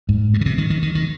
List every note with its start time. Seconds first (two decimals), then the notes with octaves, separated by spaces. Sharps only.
0.09 G#2
0.34 G2
0.41 C#3
0.46 C3
0.58 D#3
0.70 D#3
0.83 D#3
0.95 D#3